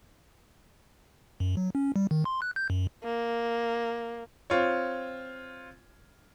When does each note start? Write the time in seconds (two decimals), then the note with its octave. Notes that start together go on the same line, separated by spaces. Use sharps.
1.40 F#2
1.57 F#3
1.75 C#4
1.96 G3
2.11 D#3
2.25 C6
2.42 F#6
2.56 G6
2.70 F#2
3.04 A#3
4.50 C4 F4 C#5